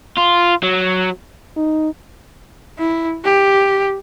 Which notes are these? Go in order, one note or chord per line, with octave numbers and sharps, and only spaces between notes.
F4
F#3
D#4
E4
G4